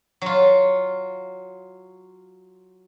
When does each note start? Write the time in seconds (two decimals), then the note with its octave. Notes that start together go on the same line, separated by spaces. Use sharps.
0.22 F#3 F4